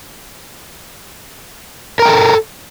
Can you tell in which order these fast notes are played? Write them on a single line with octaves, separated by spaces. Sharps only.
A#4 A#5 G5 A4